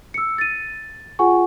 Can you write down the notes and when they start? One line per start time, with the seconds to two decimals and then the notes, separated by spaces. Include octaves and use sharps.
0.14 E6 C#7
0.38 A6 D#7
1.19 F4 G#4 F#5 G#5 C#6